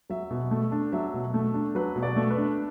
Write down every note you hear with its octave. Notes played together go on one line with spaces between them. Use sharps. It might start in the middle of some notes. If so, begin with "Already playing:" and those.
F#3 E5
B2
A3
D4
F#3 E5
B2
A3
D4
F#3 B4
B2
D5
A3
B4
D4